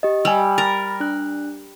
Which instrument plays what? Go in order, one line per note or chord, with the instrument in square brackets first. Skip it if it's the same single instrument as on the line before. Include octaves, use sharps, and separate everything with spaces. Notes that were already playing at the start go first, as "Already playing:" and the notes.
[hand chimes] G4 D#5
[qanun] G3 [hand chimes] G#5 E6
[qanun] A#4 [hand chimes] B5 A6
[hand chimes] D4 F#6